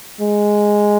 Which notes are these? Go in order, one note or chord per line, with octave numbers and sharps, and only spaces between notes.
G#3